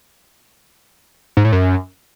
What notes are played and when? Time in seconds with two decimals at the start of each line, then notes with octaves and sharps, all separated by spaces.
1.37 G#2
1.45 A2
1.52 F#2